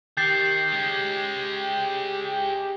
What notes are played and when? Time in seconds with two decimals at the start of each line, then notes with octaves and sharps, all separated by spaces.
0.17 D#3 G4 G6 A6 C7
0.72 G#3 C#4